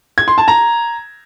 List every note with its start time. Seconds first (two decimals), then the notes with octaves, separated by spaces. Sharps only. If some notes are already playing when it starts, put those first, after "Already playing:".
0.18 G#6
0.28 C6
0.38 A5
0.48 A#5